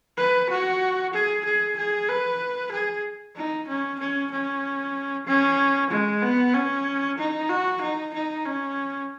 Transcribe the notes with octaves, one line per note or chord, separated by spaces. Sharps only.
B4
F#4
G#4
G#4
G#4
B4
G#4
D#4
C#4
C#4
C#4
C#4
G#3
B3
C#4
D#4
F#4
D#4
D#4
C#4